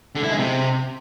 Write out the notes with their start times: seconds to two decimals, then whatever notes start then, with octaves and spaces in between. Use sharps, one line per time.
0.15 D3
0.23 E4
0.31 G#3
0.38 C3